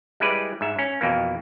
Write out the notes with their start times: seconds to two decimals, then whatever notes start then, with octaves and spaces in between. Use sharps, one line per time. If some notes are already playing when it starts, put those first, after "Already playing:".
0.20 G3 G#3 E4 B4 D5
0.61 G#2 E5
0.79 C#4
1.01 F2 B2 E3 A#3